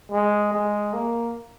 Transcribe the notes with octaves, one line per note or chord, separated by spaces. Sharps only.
G#3
G#3
A#3